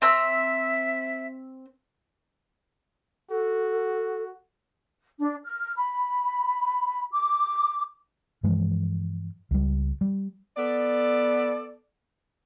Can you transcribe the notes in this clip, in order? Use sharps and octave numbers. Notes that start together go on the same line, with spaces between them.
C4 E5 A#5 E6
F#4 A4
D4
F6
B5
D6
G2 E3 F3 G#3
C#2 G3
G3
B3 A4 D5